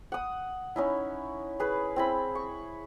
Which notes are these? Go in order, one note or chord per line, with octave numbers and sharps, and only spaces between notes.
F#5 D#6
C#4 D#4 E4
G#4 B4
C4 E4 B5
C#6